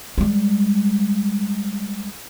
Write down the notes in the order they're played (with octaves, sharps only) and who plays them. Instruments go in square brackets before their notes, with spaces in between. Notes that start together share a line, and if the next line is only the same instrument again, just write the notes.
[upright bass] G3 G#3